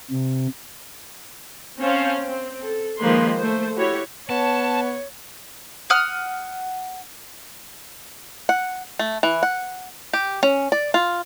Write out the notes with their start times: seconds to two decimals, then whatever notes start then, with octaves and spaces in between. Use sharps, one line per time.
0.11 C3
1.80 C4 C#4 C5 F5 A5
2.19 C4
2.62 A4
3.00 D#3 F3 G#3 A#3 B4 C6
3.38 A3 C5
3.76 E4 F#4 G4 C#5
4.29 B3 C#5 A5
5.90 F#5 D#6 F6
8.49 F#5
8.99 A3
9.23 E3
9.43 F#5
10.13 G4
10.43 C#4
10.72 D5
10.94 F4